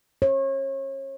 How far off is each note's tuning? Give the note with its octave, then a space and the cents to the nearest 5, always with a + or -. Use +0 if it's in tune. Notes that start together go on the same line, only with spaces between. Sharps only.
C#5 -35